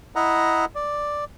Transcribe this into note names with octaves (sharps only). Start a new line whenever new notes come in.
E4 D#5 E5 F#5 A#5
D5